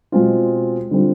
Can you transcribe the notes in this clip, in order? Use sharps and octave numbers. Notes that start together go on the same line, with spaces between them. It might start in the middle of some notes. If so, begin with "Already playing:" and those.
B2 G#3 C4 F4
D3 G3 C4 F4